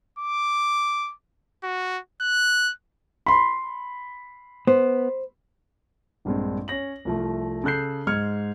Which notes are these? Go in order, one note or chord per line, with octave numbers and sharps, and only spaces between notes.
D6
F#4
F#6
B5 C6
B3 C5
A#1 G2 G#3 C4
C#4 C#5 A#6 F#7
C2 F3 A3
C#3 A4 F#6 G6 C7
G#2 G#3 F6 G#6 C#7